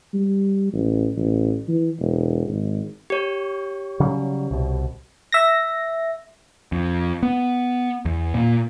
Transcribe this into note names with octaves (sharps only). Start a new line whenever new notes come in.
G3
A1
A1
E3
E1
G#1
G4 C#5
C#3 F#3 G3
C2 B2
E5 A#6
F2
B3
E2
A#2